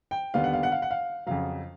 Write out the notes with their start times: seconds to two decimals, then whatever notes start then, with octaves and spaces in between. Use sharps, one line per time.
0.11 G5
0.34 D#2 D3 G3 B3 F5
0.44 F#5
0.53 F5
0.63 F#5
0.72 F5
0.82 F#5
0.91 F5
1.26 F2 C#3 F#3 F5